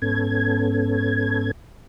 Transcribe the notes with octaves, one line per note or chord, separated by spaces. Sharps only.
G#2 B3 C#4 A4 G#6